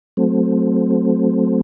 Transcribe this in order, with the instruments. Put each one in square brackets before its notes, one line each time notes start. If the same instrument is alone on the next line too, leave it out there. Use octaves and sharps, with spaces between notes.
[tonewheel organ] F#3 A3 C4